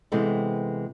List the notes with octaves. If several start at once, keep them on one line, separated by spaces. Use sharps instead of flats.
C3 E3 G#3 B3 C4 A4